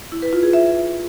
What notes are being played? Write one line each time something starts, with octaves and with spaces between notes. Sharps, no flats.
E4
B4
F4
G#4
E5